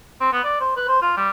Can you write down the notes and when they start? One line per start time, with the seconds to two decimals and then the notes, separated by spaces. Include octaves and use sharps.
0.21 C4
0.32 B3
0.44 D5
0.60 C5
0.77 B4
0.89 C5
1.02 F4
1.17 G3